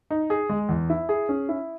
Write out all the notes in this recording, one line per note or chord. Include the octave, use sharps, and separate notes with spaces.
D#4
G#4
G#3
E2
E4
G#4
C#4
E4